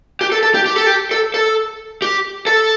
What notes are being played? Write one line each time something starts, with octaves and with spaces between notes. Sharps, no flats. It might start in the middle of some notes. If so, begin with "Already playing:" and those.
G4
A4
A4
G4
G4
A4
G4
A4
A4
G4
A4